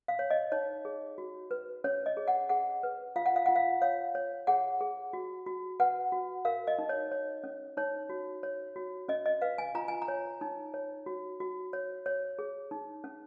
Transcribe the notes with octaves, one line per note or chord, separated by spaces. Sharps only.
F5
C#5
D#5
D#4 C#5
G#4
F#4
B4
C#4 C#5
D#5
G#4
F#5
G#4 F#5
B4
F4 F5
F#5
F5
F4 F#5
F5
C#5 F5
C#5
G#4 F#5
G#4
F#4
F#4
B4 F#5
F#4
A#4 F5
D#5
D#4
C#5
C#5
C#4
D#4 C#5
F#4
C#5
F#4
C#4 D#5
D#5
B4 F5
G#5
F4 A#5
G#5
A#5
C#5
D#4
C#5
F#4
F#4
C#5
C#5
G#4
D#4
C#4